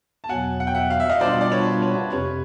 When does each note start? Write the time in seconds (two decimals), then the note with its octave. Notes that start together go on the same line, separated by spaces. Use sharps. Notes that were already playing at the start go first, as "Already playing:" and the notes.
0.24 A5
0.29 E2 B2 F#3 B3 F#5 G#5
0.60 F#5
0.67 G5
0.75 E5 F#5
0.90 F5
1.00 E5
1.09 D#5 F5
1.21 B2 G3 B3 D4 F4 C5 D5
1.41 D5
1.52 B4 C#5
1.82 B4 C#5
2.12 F2 C3 B4 C#5